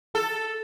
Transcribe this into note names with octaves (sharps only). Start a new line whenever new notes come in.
A4